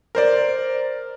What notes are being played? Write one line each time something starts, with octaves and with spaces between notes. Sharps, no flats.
A#4 C5 D5